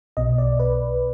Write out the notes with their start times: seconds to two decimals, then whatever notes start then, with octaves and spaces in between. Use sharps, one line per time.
0.17 B1 B2 D#5
0.38 D5
0.60 B4